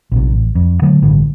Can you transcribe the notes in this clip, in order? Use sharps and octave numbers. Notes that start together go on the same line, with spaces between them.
A#1 C3
A1
F2
D3 F#3 A3
A1 G2 D3